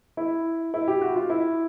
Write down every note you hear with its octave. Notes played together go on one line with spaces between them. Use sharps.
E4
E4
G4
F#4
F4
E4